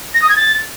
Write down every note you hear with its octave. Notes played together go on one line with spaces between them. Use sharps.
A#6
D#6
G#6
A6